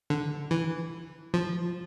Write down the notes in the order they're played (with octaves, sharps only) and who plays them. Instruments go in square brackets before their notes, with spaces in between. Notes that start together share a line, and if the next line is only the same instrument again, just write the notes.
[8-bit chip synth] D3
E3
F3